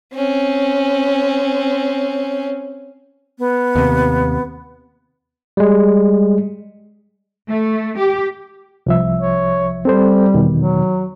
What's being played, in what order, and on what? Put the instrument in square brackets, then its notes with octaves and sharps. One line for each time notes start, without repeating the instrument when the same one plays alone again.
[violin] C4 C#4
[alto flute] B3
[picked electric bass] D#2 C3
[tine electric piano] G3 G#3
[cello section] A3
G4
[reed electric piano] C2 F3 E5
[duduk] C#5
[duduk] G3 [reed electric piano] C4 A4 C5
[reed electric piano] E2 B2 D#3
[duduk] F#3